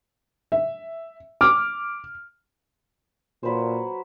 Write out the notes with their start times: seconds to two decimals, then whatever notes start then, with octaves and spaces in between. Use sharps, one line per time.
0.52 E5
1.41 D6 F6
3.43 A#2 F#3 B4 C5